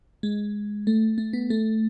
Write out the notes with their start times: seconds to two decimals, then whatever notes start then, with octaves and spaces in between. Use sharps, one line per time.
0.23 G#3
0.87 A3
1.18 A3
1.33 B3
1.50 A3